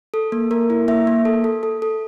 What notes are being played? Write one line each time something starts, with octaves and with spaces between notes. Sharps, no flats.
A4
A#3
A#3 A#4
E4
A#3 E5
A#3
A4
A4
A4
A4